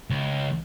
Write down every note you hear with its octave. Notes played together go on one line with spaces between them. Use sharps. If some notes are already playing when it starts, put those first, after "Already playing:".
C#2